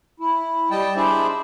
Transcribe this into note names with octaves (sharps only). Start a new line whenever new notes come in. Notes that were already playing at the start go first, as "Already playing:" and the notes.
E4
G3 D#5 G5 A5
D4 E4 G#4 C5 D5 E5